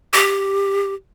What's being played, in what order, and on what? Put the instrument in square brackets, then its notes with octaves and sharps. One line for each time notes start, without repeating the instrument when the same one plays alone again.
[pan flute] G4